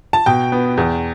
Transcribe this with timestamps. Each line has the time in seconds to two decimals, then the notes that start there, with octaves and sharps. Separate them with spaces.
0.13 A5
0.26 B2 G5
0.52 B3
0.77 E2